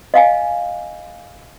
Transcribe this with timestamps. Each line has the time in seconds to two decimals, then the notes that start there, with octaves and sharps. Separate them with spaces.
0.14 D#5 F5 G#5